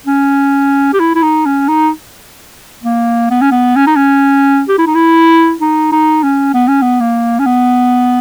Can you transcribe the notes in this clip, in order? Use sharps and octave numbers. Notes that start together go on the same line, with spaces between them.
C#4
G4
E4
E4
D#4
C#4
D#4
A#3
B3
C#4
B3
C#4
D#4
C#4
G4
E4
D#4
E4
D#4
D#4
C#4
B3
C#4
B3
A#3
C#4
B3